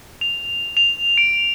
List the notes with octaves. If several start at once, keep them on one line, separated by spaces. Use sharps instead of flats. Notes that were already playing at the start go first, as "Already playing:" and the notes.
F7
F7
D7